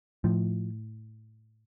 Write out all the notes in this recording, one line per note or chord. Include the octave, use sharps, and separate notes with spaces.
A2 F3